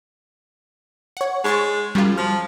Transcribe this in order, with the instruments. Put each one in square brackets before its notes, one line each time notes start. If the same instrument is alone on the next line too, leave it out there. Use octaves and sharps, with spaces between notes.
[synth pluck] C#5 F#5
[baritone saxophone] G#3 [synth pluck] C6 C#6 A6
[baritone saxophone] F#2 [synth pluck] G3 F4
[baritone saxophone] F3 [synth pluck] F6